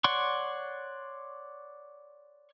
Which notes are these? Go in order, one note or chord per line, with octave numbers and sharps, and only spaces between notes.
C#5 D5 F#5 C6 C#6